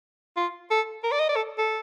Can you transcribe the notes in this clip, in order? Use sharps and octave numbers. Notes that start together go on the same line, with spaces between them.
F4
A4
A#4
D5
D#5
D5
A4
A4